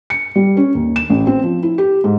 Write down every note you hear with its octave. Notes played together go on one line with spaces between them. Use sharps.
C#7
G3
C#4
D#2
E7
A1
C4
F3
E4
G4
G#2